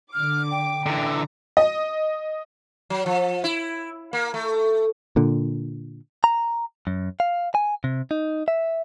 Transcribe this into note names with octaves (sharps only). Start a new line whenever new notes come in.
D3 D6 F6
G5
D3 E3 A#5
D#5
F#3
F3
E4
A#3
A3
A#2 D3
A#5
F#2
F5
G#5
C3
D#4
E5